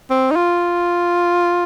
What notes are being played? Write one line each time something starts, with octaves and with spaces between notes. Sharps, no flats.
C4
D#4
F4